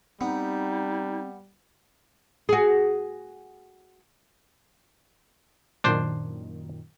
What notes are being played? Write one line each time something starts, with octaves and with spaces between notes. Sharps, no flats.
G3 B3 C4 D#4
F#4 G#4
F#2 A#2 D#3 D4 C5